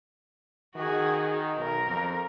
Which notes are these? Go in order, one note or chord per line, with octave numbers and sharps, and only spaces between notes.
D#3 F#4 G#4
B1 A#4
F2